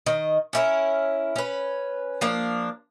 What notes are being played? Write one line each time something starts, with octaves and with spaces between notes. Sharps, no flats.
D#3 D#5
C#4 E4 A#4
C#4 B4
F3 A#3 D4